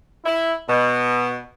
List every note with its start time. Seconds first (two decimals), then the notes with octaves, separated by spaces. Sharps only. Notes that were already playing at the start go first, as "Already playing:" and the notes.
0.24 E4
0.68 B2